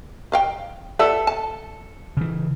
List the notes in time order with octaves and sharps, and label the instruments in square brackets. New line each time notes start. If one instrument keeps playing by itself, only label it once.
[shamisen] B4 F5 G5
[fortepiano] A4 E5 E6 [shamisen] B4 D5 F#5
[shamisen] A5
[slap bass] C#3 E3